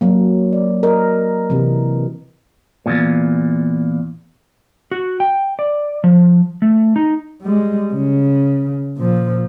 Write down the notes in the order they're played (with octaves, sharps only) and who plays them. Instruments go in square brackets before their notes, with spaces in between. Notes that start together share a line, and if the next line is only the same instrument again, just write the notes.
[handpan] F#3 A#3
D5
A#4 D#5
C3 E3
[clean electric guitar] E2 G2 A#2
[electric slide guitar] F#4
G5
D5
F3
A3
D#4
[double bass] G3 G#3
C#3
A#2 F3